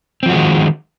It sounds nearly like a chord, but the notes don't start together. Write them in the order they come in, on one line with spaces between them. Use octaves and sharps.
C4 F3 F#4 G#3 D#3